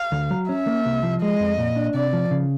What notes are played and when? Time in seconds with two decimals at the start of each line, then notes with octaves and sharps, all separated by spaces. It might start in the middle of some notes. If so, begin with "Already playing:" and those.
Already playing: F5
0.12 D2
0.31 F#3
0.49 C#4 E5
0.67 A#3
0.85 C2
1.03 F3
1.22 G#3 D#5
1.40 F2
1.58 A#2
1.76 D4
1.94 C3 D5
2.13 F3
2.31 C#3